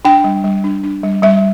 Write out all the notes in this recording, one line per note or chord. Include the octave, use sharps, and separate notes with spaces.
D4 G5
G3
G3
D4
D4
G3
G3 E5